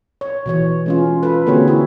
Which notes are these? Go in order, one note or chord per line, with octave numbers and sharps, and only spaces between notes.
C#5
B2 E3 C#5
G#3 C#4 F4
F4 A4 B4
D3 A#3 C4 F#4 G#4 C#5
E4 G#4